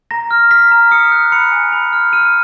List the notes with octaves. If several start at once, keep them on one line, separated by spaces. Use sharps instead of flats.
A#5 A#6
F6
F6 B6
A#5
D#6 C#7
F#6
B5 C#7
G#5
B5
F6
F6 D#7